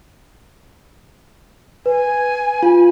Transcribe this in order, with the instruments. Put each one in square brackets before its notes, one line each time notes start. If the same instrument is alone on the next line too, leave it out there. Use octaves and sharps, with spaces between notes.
[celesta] B4 [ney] G#5
[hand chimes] F4